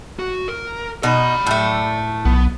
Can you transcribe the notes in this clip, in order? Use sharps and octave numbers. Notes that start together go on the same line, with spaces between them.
F#4
A#4
B2 D#4 D5 B5
A2 A3
B1 B3